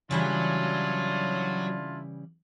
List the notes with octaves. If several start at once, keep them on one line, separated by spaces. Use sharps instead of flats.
C#3 E3 F#3 G3 D4 E4 F4